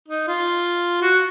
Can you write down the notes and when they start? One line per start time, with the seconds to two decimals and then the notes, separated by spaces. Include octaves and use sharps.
0.08 D#4
0.28 F4
1.02 F#4